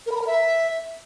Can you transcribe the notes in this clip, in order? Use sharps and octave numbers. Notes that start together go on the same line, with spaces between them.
A#4
B5
A#5
A#4
E5